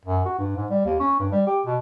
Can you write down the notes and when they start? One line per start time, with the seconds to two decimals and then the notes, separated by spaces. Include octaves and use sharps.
0.05 F#2
0.25 F#4
0.38 G2
0.56 G#2
0.70 G3
0.85 D#2
1.00 C#4
1.20 G2
1.32 G3
1.47 G4
1.66 B2